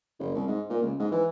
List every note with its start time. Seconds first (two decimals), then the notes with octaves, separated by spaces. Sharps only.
0.19 F#1
0.35 C2
0.47 G#2
0.70 A#2
0.82 C#2
0.99 G#2
1.12 E3